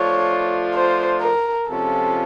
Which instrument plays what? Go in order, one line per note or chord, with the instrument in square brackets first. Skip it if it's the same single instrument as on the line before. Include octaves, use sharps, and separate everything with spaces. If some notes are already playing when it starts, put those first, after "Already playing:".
Already playing: [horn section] F3 A3 D4 F4 [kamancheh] C#5
[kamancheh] C5
A#4
[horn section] C3 F3 G#3 C#4 F4 [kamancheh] A4